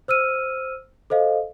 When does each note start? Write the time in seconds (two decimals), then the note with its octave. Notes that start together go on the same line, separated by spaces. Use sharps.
0.08 C5 E6 F6 D#7
1.10 A4 C5 D#5 F5